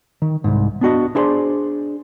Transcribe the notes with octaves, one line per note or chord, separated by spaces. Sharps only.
D#3
C2 G#2
B3 D4 F#4 D#5
D4 E4 G#4 C5 D5 C6